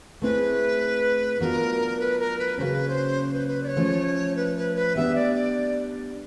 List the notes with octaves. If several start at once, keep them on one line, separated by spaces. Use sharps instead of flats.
A3 C4 E4 G#4 B4
F#3 B3 D4 F4 A#4
B4
A#4
B4
C#3 F#3 A#3 C#4 B4 C5
C5
B4
B4
D5
C#5
F3 A3 C#4
B4
B4
B4
G3 B3 D4 E5
D5
D5